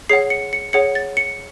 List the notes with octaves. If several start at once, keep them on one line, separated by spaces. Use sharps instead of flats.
G#4 C#5 F#5 C7
C#7
C#7
G#4 C#5 F#5 C#7
A6
C#7